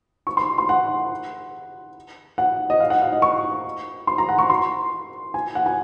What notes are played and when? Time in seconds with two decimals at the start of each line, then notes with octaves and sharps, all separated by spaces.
0.27 C#6
0.37 C6
0.58 C6
0.69 F#5
2.38 F#5
2.70 D#5
2.80 F5
2.90 F#5
3.02 F5
3.12 D#5
3.22 C#6
4.07 C6
4.18 A#5
4.29 F#5
4.39 C#6
4.50 C6
5.34 G#5
5.55 F#5
5.66 G#5